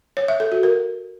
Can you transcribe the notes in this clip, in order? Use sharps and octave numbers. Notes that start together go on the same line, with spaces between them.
C#5
E5
A4
F#4
A#4